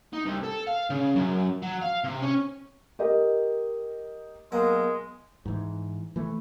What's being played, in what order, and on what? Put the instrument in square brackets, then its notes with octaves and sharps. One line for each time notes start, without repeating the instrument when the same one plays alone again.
[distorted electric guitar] D#4
C2
A4
F5
C#3
F#2
F#3
F5
C3
C#4
[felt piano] G4 A#4 D#5
[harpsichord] B1 A#3 [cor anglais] G#3
[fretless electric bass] G#2 E3
E3 A3